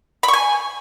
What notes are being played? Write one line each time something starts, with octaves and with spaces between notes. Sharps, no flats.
B5
C#6
G#5